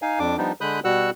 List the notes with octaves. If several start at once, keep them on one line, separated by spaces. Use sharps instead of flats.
D#4 F5 G#5
F2 D4 D6
F3 G3 B3 D4 D#4
D3 G#3 B5 D#6 F#6 G6
B2 G3 F#4 F#5 E6 F#6